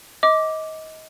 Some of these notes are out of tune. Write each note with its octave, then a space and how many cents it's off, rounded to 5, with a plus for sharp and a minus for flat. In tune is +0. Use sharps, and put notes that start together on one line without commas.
D#5 +25 D6 +0